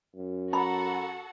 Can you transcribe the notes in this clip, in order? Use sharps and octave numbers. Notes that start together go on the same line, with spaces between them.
F#2
F#4 A4 F#5 A#5 B5